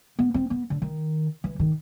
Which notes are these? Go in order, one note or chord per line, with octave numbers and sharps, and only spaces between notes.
B3
C4
B3
D3
D#3
E3
D#3